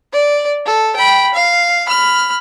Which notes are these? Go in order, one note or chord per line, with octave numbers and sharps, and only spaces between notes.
D5
A4
G5 B5
F5
B5 F6